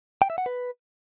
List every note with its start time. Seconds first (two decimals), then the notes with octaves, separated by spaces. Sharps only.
0.22 G5
0.30 E5
0.38 F#5
0.46 B4